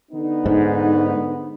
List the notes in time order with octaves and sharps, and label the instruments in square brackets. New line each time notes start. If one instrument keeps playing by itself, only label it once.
[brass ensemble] D3 B3 D#4
[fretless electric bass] G#2